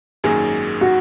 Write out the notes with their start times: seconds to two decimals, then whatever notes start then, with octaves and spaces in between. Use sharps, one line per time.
0.24 G#1 F#2 D#3 F#3 A#3 G#4
0.81 F#4